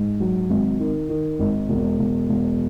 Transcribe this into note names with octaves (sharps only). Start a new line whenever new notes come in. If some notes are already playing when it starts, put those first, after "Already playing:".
Already playing: G#2
F#3
G#1
D#3
D#3
G#1
E1
E1
E1